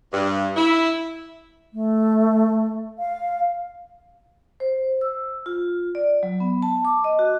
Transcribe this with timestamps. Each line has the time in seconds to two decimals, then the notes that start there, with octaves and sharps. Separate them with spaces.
0.12 G2
0.56 E4
1.74 A3
2.98 F5
4.60 C5
5.01 E6
5.46 F4
5.95 D5
6.23 F#3
6.40 B3
6.62 A5
6.85 D6
7.04 D#5
7.19 F#4